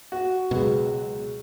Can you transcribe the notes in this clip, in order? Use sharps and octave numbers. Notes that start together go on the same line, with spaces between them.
F#4
C#2 B2 F#3 G#3